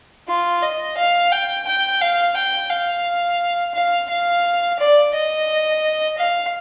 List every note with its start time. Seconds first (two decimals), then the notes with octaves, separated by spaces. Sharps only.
0.28 F4
0.62 D#5
0.97 F5
1.32 G5
1.67 G5
2.01 F5
2.36 G5
2.70 F5
3.74 F5
4.09 F5
4.79 D5
5.14 D#5
6.18 F5